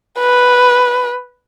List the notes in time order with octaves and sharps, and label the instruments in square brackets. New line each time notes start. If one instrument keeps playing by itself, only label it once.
[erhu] B4